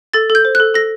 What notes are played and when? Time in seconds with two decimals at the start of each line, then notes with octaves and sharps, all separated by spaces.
0.13 A4 A6
0.30 A4
0.35 G6
0.45 C5
0.55 F#6
0.60 A4
0.74 A4 A#6